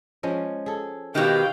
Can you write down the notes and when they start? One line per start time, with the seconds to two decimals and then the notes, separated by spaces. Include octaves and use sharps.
0.23 F3 G#3 C#4
0.66 G#4 A4
1.15 B2 D#3 G4 F5 G5